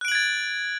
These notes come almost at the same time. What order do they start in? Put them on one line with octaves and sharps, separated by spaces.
F#6 D7 F#7 G#6 A6